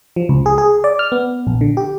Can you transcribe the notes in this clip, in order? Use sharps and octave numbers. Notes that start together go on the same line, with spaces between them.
F3
C#2
G#4
G#4
D5
F6
B3
A#1
D3
G4